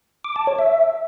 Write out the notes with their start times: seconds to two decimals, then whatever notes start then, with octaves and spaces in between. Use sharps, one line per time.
0.24 D6
0.36 A5
0.47 C#5
0.59 E5